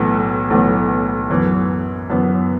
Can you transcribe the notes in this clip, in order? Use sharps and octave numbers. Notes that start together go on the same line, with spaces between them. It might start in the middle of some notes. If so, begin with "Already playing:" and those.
Already playing: B1 A2 E3 B3
B1 A2 E3 B3
F#2 E3 B3
F#2 E3 B3